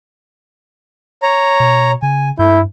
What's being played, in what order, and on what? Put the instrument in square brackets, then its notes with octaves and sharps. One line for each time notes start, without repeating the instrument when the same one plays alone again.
[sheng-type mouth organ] C#5 A#5
[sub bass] B2
[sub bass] C#3 [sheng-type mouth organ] G#5
[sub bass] G2 [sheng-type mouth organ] A3 G6 [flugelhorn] E4